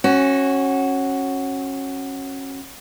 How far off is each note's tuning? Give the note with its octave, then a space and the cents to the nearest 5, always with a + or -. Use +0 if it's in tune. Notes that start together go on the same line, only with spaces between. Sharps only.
C#4 -25 F#4 +5